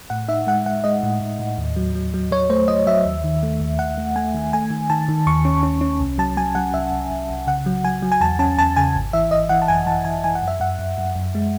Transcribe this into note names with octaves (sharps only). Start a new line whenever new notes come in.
A2 F#5
D#4 E5
G#3 F#5
G#3 F#5
G#3 D#5
A2
A2
A2
D#2
F#3
F#3
F#3
F#3 C#5
A3 C5
F#3 D#5
F#3 E5
D#2
D#3
A3
D#2
D#2 F#5
A3
A3 G#5
D#3
A3 G#5
D#3
D#3 A5
D#3
D#2 C#6
C#4
C#4
C#4
C2
F#3 A5
F#3 G#5
F#3 F#5
C2 E5
C2
C2
C2
C#3 F#5
F#3
F#3 G#5
F#3
G#5
E2 A5
C#4 A5
E2 A5
C#3 G#5
G#1
E3 E5
G#1 D#5
E3 F#5
A5
F#2 G#5
E3 A5
E3 G#5
E3 G#5
F#5
F#2
E5
F#2 F#5
F#2
F#2
F#2
G#3